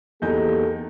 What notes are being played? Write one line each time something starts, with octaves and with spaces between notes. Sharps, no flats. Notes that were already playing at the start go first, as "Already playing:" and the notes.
E2 A#3 D#4 G4 A4 G6